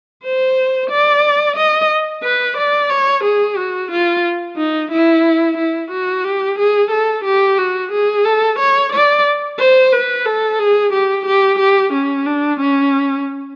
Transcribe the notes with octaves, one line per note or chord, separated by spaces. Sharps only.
C5
D5
D#5
B4
D5
C#5
G#4
F#4
F4
D#4
E4
E4
F#4
G4
G#4
A4
G4
F#4
G#4
A4
C#5
D5
C5
B4
A4
G#4
G4
G4
G4
C#4
D4
C#4